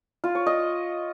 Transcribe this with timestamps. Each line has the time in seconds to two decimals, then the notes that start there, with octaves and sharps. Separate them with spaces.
0.24 F4
0.35 C#5
0.46 D#5